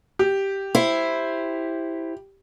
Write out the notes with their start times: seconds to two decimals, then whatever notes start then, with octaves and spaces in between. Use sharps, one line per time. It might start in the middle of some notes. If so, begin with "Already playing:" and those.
0.19 G4
0.75 E4 C5